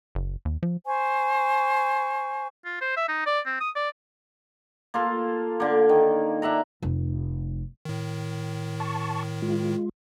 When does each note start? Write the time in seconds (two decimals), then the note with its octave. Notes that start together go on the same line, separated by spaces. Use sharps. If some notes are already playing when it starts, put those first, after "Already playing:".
0.15 F#1
0.45 D#2
0.63 F3
0.86 C5 G#5 C#6
2.65 F4
2.81 C5
2.97 E5
3.09 D#4
3.27 D5
3.46 C4
3.61 D#6
3.76 D5
4.94 A#3 F4 A4
5.60 D3 A#3
5.89 D#3
6.42 D4 E5 F#5 A#5
6.83 F1
7.85 A2 D#3
8.80 A5 C#6
9.42 G#3 F4